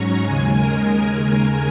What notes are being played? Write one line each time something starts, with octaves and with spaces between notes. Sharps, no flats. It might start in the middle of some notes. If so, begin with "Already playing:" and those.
Already playing: G#2 F#3 C#4 A#5 C#6
D#2 C#3 G#3 G#5
A#4